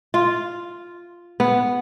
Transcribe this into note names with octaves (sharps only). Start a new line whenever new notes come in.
F4
B3